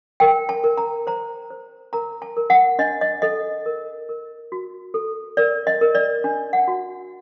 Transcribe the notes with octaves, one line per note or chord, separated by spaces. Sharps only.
A#4 G5
A5
A#4
A#5
C5 A#5
C5
A#4 A#5
A5
A#4
F#5
D4 D#5
D#5
A4 D#5
A#4
A#4
F#4
A4
A#4 D5
D#5
A#4
D5
D4
F#5
F#4